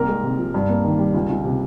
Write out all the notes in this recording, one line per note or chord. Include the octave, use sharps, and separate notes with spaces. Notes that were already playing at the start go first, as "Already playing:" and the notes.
Already playing: C2 A#3 A#4
G#3
C3
F3
G2
A#3
D#3
G3
C#2
C#2
C3